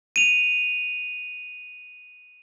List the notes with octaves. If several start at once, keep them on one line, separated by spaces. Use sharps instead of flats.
D#7 F7